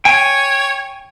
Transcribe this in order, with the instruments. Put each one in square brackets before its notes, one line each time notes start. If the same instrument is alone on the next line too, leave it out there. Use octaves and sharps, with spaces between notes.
[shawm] C#5 [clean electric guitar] G5 G#5